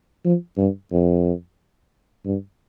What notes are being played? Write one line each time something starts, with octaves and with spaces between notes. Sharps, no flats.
F3
G2
F2
G2